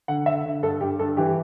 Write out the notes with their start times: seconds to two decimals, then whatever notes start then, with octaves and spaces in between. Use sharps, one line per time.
0.08 D3 F#5
0.26 D3 E5
0.45 D3
0.62 G2 A4
0.81 G2 G4
0.99 G2 A4
1.17 E3 G4